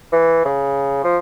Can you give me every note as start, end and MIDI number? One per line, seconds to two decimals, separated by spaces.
0.12 0.44 52
0.45 1.04 49
1.04 1.18 53